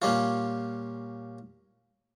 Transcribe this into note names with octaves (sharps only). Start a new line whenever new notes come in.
A#2 G3 C#4 F4